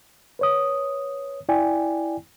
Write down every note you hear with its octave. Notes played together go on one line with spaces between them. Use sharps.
B4 C#5 D#6
E4 D5 G5 G#5